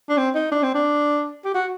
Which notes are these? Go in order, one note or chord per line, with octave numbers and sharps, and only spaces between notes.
D4
C4
D#4
D4
C4
D4
G4
F#4